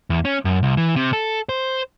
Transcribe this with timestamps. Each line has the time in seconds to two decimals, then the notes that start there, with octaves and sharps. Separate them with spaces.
0.10 E2
0.25 C#4
0.45 F#2
0.63 C2
0.77 E3
0.96 C3
1.13 A4
1.49 C5